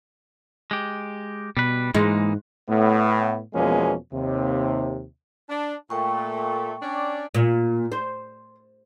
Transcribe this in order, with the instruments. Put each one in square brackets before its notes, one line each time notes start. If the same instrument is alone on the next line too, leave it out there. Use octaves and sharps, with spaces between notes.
[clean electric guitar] G#3 G4
[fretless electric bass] B2 [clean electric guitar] G3 B4
[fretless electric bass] G#2 [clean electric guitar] E3 A#3 D#4 [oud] G#3
[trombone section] A2 A3 B3
E2 B2 F3 G#3 A#3 C#4
D#2 C3
[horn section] D4
[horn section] A#2 A3 [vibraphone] G5 C#6
[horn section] C#4 D4 D5
[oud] A#2
C5